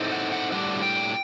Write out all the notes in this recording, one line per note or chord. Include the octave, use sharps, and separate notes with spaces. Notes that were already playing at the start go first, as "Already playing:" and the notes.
Already playing: A2 A3 C4 D#4
F#5
F#5
A2 G3 D4 F#5
G5